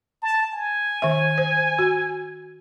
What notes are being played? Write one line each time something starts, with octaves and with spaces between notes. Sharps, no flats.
A5
G#5
D#3 E5
C5
F#4